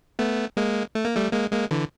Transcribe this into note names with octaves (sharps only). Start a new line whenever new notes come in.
A3 B3
G#3 A#3
A3
A#3
G3 A3
G#3 A#3
G#3 A#3
D3 E3